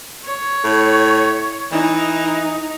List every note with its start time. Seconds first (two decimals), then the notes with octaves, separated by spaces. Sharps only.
0.24 C#5
0.64 A2
1.71 E3 D#4